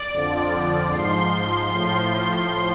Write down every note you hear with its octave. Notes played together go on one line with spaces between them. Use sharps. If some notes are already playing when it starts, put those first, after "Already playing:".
Already playing: D5
F2 D3 F3
G#2 F3 C6
A2 F3 C6